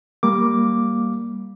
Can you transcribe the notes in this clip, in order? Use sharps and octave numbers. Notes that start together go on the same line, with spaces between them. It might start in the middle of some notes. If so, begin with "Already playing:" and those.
G3 A#3 D6